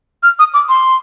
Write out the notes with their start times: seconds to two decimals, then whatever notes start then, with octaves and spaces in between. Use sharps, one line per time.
0.23 F6
0.39 D#6
0.54 D6
0.69 C6